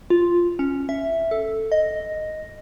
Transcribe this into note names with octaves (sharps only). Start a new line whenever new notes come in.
F4
C#4
E5
A4
D#5